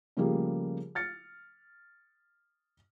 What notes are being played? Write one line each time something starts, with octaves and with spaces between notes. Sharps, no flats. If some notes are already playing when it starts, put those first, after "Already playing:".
C#3 F3 G3 A3 A#3 G#4
F6 A6 C#7